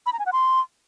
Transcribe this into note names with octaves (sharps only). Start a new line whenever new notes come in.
B5
A#5
G#5
F#5
C6